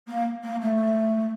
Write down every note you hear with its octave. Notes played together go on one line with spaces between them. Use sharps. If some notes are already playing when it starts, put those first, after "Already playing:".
A#3
A#3
A3